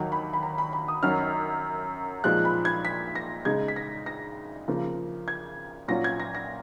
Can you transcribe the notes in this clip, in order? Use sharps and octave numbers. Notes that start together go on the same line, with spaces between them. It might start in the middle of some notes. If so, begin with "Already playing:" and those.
Already playing: D#2 D#3 F#3
B5
B5
A#5
B5
B5
D#6
F#2 D#3 F#3 C#4 F6
A#2 F3 G#3 D#4 F#6
B5
G#6
B6
A#6
C#3 G#3 D#4 G#6
B6
A#6
A#6
C#3 F3 A#3
G#6
A#2 F#3 C#4 F4 A#6
G#6
A#6
A#6